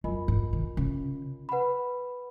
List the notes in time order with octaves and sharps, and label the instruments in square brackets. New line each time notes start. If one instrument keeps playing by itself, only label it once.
[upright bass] F#2 [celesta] F4 A#4 D#5 G#5 B5
[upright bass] G#2
D#3
C#3
[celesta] B4 F#5 B5